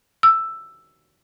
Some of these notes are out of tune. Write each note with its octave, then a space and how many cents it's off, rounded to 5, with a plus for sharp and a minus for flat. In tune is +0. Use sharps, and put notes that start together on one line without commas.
E6 +5